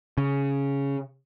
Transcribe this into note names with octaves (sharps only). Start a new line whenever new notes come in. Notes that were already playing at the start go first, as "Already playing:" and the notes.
C#3